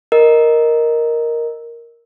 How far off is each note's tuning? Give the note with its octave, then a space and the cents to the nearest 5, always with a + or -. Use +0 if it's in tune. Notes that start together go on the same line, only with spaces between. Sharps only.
A#4 +0 D#5 +0